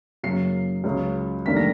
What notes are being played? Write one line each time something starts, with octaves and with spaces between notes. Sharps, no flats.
F#2 C#3 F#3 A#3 C7
C#2 C#3 F#3
F1 D#2 D3 G3 A#3 B6
A#6